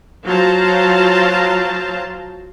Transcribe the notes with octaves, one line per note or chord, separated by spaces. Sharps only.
F#3 F4 C5 F5 A5 A#5